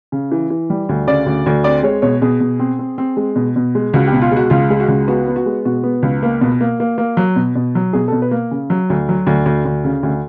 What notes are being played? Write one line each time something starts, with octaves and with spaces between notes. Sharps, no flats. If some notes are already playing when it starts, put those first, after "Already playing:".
C#3
E3
E3
G3
D2
C#3 D5
D2
D2
C4 D5
G#3 C#5
B2 C#5
B2 G#4
B2
C4
C4
C4
G#3
B2
B2
G#3
C#2 F#4
G4
B2
F4
G#3
F#4
C#2 F4
G#3
F#4
C#2
B3 F#4
B3
F#4
G#3
B2 F#4
B3
C#2
A#3
B2
A#3
A#3
A#3
F#3
B2
B2
F#3
B2 G#4
B2 A4
B4
A#3
C#3
F#3
D2
F#3
D2
D2
D2
C#3
D2